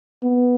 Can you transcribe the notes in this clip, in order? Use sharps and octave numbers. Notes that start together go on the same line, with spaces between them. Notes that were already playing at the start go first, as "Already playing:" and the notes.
B3